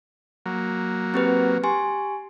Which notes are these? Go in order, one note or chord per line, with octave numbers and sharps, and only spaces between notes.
F#3 A#3
C4 G4 B4
G4 G#5 C6